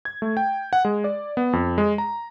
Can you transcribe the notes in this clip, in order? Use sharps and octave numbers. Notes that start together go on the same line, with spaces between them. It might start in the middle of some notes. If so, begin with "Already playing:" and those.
G#6
A3
G5
F#5
G#3
D5
B3
F2
G#3
A#5